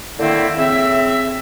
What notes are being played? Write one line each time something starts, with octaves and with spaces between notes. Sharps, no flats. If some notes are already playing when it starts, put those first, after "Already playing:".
A2 D3 D#3 A#3 C4 E4
C#3 C4 E5